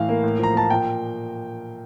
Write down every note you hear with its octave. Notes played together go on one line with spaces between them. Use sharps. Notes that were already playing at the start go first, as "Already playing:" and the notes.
Already playing: A2 E3 F5
A#3
A2
F3 A#5
A#3 A5
A#2 G5